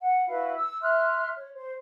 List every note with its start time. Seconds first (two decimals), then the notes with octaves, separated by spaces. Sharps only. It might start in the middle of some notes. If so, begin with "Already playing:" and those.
0.01 F#5
0.27 E4 F#4 B4 F5
0.56 E6
0.82 E5 C6 F6 F#6
1.36 C#5
1.55 C5